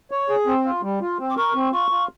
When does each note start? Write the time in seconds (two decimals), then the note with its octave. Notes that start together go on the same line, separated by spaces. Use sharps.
0.11 C#5
0.29 G#4
0.47 C4
0.65 F4
0.83 G3
1.01 F4
1.19 C4
1.30 D6
1.37 A#4 C#6
1.54 C4
1.72 F4 C#6
1.91 F4